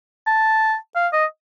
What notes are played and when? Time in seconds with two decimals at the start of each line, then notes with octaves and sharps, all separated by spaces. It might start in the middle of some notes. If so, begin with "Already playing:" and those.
0.27 A5
0.96 F5
1.13 D#5